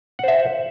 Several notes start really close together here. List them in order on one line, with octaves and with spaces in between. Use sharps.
F#5 C5 E5